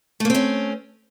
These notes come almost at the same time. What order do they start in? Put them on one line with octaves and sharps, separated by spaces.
A3 A#3 C4 C#4